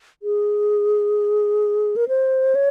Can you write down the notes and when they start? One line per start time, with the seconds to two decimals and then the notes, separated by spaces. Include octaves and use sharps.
0.23 G#4
1.96 A#4
2.08 C5
2.55 C#5